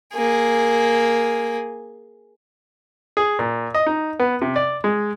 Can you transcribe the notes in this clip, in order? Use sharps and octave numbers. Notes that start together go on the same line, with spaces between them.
A#3 G#4
G#4
A#2
D#5
D#4
B3
C3
D5
G#3